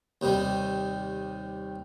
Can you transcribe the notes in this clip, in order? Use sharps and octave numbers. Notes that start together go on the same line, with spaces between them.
D#2 C3 D#3 G3